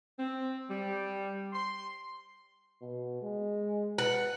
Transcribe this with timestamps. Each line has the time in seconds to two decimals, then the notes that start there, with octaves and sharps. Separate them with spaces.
0.18 C4
0.69 G3
1.53 C6
2.81 B2
3.22 G#3
3.98 B4 F#5